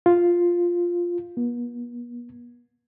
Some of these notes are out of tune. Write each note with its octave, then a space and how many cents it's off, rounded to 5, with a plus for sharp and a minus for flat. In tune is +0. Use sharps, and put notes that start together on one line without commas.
F4 +0
B3 -45